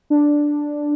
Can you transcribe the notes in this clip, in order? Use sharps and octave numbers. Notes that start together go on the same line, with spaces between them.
D4